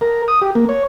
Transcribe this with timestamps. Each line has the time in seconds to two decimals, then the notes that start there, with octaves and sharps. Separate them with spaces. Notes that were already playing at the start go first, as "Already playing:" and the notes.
0.01 A#4
0.28 D#6
0.41 G4
0.55 A#3
0.69 C#5